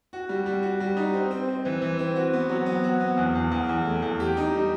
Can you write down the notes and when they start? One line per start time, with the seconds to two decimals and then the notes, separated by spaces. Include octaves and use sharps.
0.13 F#4
0.29 G3
0.46 G3
0.63 F#4
0.80 G3
0.97 D#4
1.14 C4
1.31 C4
1.48 C4
1.65 E3
1.82 E3
1.99 C4
2.16 F#4
2.33 B3
2.49 F#3
2.66 B3
2.84 F#4
3.01 B3
3.17 E2
3.35 E2
3.51 E2
3.69 E2
3.85 A3
4.02 E2
4.20 G4
4.37 D#4
4.54 G3